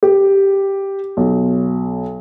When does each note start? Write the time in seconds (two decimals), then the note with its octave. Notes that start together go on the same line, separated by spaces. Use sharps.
0.03 G4
1.17 B1